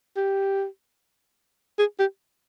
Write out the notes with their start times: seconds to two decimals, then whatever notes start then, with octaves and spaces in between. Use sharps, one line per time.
0.16 G4
1.79 G#4
1.99 G4